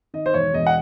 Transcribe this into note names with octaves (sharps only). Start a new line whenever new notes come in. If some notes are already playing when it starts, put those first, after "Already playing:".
D#3 D#5
C5
E1 C#5
E1 D#5
F#5